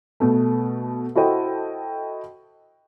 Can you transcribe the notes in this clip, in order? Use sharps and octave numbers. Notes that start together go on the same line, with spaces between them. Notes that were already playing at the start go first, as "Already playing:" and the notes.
B2 A3
E4 F#4 A4 C5 D#5 G5